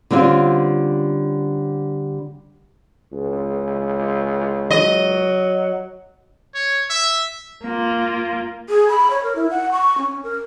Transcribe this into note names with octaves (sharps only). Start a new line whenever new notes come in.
D3 G3 C4 C#4 F4
C#2
F#3 D#5
C#5
E5
A#3 F4
G#4
B5
C#5
A#4
E4
F#5
C#6
C#4
A#4